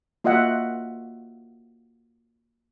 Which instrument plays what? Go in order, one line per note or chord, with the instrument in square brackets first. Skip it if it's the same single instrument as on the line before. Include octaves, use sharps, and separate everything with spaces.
[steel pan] A#3 F4 F#4 D#5 E5 F#5